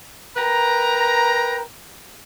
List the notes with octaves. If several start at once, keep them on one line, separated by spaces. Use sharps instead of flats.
A#4 B4 G5 A#5